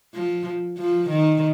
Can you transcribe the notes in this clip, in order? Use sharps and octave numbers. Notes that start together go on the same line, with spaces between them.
F3
F3
D#3